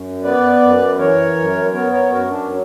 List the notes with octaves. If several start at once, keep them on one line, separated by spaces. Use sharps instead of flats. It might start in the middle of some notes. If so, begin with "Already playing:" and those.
Already playing: F#2
B3 B4 D5
F#2
E3 A#4 C#5
F#2
B3 A#4 C#5
A#4 C#5
F#2 F#4 A#4
D4
F#3